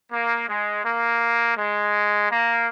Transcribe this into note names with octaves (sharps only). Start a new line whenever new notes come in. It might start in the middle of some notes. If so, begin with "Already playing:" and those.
A#3
G#3
A#3
G#3
A#3